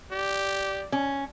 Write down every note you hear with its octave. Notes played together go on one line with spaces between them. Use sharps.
G4 D5
C#4